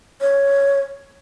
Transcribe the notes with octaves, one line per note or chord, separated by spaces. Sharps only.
C#5